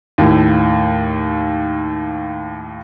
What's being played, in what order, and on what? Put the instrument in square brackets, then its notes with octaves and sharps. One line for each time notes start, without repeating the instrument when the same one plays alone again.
[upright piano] D#2 A2